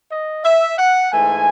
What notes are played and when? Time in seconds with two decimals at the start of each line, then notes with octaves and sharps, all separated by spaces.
0.10 D#5
0.44 E5
0.78 F#5
1.12 G#2 E3 A3 G#5